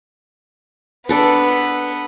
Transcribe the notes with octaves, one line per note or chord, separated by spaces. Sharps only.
B3 D4 A4 B4